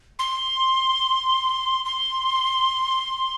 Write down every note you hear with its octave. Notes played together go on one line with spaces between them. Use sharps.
C6
C6